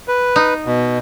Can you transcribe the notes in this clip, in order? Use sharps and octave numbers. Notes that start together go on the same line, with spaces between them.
B4
D#4
B2